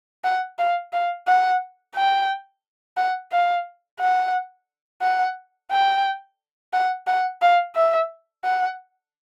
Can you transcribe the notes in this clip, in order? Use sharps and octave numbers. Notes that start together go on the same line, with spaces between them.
F#5
F5
F5
F#5
G5
F#5
F5
F#5
F#5
G5
F#5
F#5
F5
E5
F#5